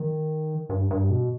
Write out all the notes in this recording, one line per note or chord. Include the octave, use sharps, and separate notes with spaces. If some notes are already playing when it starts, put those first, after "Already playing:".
Already playing: D#3
G2
G2
B2